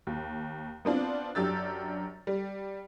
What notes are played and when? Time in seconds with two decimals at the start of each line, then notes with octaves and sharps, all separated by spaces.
0.07 D#2
0.85 B3 C4 D4 F4
1.35 F#2 D4 G4 E6 A6
2.27 G3